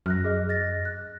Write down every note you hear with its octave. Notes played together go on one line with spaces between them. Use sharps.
F#2 F6 F#6 A#6
G#4 D#5
D#5 A6 A#6
F#6